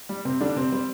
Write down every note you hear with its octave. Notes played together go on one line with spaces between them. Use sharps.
G3
C3 C4
D3 G3 D4
C3 C4
G3 C4